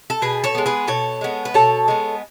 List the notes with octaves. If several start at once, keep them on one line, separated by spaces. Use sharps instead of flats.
A4
B2 G#4 B4
A4 C#5
G#3 B3
G#4 B4
B2 A4 C#5
G#3 B3
B4
B2 A4 C#5
G#3 B3